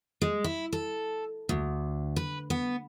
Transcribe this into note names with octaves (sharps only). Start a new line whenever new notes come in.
G#3
E4
A4
D2
B4
B3